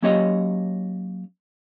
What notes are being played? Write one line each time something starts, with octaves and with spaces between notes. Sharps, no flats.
F#3 A#3 C#4 G4 C#5 D#5